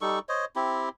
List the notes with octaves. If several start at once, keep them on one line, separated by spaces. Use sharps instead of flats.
G3 D#4 A4 C#6
C5 C#5 D#5
C4 E4 G4